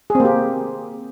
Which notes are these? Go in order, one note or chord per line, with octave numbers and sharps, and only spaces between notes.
A#3 C4 G4 G#4